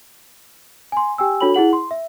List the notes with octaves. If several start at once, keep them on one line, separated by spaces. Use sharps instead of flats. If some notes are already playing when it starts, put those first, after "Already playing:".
G#5 C6
G4 G5 G#5 E6
D4 F#4 A4 C#5 B5 F#7
E4 G#4 F#5 F#7
C6
E5